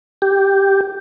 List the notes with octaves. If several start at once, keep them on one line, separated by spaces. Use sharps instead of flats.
G4